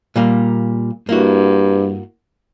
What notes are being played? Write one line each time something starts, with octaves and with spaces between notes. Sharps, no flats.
A#2 G3 A#3
G2 A#3 E4 F#4